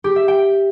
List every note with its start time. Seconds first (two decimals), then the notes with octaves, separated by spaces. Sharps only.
0.04 G4
0.16 E5
0.28 G5